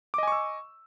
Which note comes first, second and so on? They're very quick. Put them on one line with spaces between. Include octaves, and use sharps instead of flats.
D6 D#5 G#5 C#6 E6